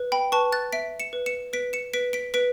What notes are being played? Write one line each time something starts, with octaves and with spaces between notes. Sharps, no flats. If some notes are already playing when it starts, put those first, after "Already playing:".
Already playing: B4
G5 B5
B4 A5 C#6
F#6 A6
E5 B6 D7
C#7 E7
B4
C#7 E7
B4 B6 D7
C#7 E7
B4 B6 D7
B6 D7
B4 B6 D7